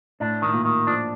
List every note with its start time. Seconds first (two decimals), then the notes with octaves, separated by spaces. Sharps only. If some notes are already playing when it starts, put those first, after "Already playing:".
0.20 A2 D4
0.42 A2 D#3
0.53 A#2
0.65 D#3
0.87 F3 D4